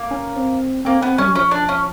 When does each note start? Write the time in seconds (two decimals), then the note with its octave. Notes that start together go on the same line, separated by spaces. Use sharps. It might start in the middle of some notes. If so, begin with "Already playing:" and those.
Already playing: A#3
0.11 C#4
0.36 C4
0.85 A#3 C4
1.01 B3 C4
1.18 G3 C#4
1.27 F#3
1.35 F3 C#4
1.51 D4
1.69 C#4